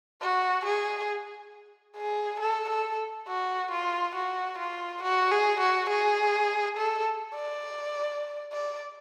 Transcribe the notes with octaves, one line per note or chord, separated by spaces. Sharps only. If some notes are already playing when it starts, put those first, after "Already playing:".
F#4
G#4
G#4
A4
A4
F#4
F4
F#4
F4
F#4
G#4
F#4
G#4
A4
D5
D5